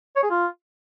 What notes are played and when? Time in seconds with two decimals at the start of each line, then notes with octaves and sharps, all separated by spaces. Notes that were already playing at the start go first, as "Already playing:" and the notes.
0.16 C#5
0.23 G#4
0.30 F4